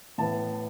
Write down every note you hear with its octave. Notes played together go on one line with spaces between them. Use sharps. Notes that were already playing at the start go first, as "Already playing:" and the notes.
A2 E3 B3 A5